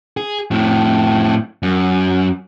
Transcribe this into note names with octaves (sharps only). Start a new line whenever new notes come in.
G#4
F2 A2
F#2